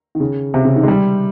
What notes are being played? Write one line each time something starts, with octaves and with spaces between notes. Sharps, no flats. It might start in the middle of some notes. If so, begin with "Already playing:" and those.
D#3
C#3
C3
C#3
D#3
G#3
G3